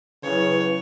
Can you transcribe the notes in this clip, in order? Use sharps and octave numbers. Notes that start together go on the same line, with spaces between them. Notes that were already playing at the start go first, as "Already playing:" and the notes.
C#3 F#3 E4 B4 C#5